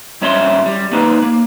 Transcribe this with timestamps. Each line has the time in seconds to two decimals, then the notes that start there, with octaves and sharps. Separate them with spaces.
0.22 G2 C#4 E4 E5 B5 C6
0.66 G3
0.92 A#3 D#4 B4
1.22 A#3